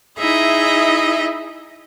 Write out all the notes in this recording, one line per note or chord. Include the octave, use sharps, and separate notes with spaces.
D#4 E4 G#4 D#5 E5